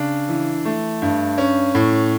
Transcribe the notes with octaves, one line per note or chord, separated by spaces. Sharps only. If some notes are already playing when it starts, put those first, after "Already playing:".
Already playing: C#3 D4
E3
A3
G2
C#4
A2